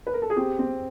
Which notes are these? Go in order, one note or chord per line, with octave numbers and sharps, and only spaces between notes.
B4
A#4
A4
G#4
C4 G4
C4